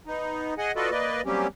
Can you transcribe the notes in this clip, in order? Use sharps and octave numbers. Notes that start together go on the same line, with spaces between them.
B3 D#4
G#4 D#5 F#5 G#5
F4 F#4 A4 B4 D5 D#5
A#3 B4 D5 D#5
F#3 G3 A#3 C4 C#4 G4